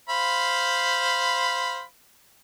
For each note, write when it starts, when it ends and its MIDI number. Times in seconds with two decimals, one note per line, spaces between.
0.09 1.82 72
0.09 1.82 77
0.09 1.82 83